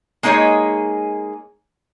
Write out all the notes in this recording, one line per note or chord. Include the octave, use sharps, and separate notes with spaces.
G#3 A#3 D#4 G#4 C#5